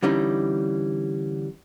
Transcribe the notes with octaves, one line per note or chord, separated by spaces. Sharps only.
D3 E3 G3 C#4 D#4